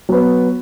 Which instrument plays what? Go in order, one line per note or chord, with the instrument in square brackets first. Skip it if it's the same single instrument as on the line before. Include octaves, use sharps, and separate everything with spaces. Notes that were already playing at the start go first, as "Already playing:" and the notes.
[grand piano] F#3 B3